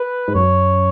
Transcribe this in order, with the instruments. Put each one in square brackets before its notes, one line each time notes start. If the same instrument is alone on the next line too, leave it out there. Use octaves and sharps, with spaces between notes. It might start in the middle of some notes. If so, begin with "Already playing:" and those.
Already playing: [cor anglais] B4
[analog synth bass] G#2
[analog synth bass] F#2 [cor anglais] C#5